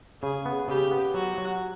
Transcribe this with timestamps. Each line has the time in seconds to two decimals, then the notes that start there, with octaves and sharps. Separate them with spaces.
0.23 C#3 G#4
0.46 B3
0.68 C#3 G4
0.91 B3
1.14 F#3 F#4
1.38 F#3